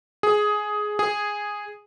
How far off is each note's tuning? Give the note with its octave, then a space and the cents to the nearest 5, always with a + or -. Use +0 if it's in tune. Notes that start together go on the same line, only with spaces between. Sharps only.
G#4 +10
G#4 -5